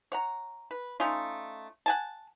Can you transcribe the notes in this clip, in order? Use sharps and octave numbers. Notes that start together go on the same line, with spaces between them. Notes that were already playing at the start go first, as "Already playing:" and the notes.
C#5 F#5 A#5
B4
A3 C#4 D#4 F4
F#5 G#5 A5